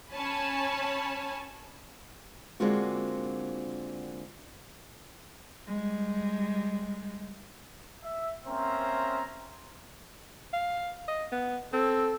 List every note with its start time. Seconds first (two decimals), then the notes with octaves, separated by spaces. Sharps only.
0.11 C#4 C#5 G#5 A5 B5
2.60 D3 G#3 A#3 C4 F4 F#4
5.68 G3 G#3
8.03 E5
8.47 A#3 C4 C#4 C5 E5 A#5
10.53 F5
11.08 D#5
11.32 B3
11.73 C4 A4